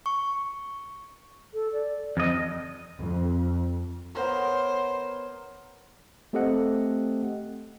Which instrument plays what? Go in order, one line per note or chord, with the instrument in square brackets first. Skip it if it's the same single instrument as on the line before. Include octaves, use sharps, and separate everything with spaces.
[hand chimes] C#6
[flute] A4
D5
[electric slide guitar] F2 D#5
[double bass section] F2
[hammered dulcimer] B3 A#4 C#5 [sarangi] C5
[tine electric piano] A3 C4 G4 A4 D#5 F#5